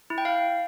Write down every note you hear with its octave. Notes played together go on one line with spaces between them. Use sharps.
E4
G5
F5